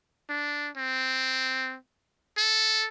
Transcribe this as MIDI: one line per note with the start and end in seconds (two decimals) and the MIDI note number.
0.29 0.69 62
0.77 1.77 60
2.38 2.88 69